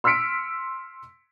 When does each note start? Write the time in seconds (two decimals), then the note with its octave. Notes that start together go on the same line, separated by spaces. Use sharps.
0.04 C6 E6 F6 B6 C#7 D7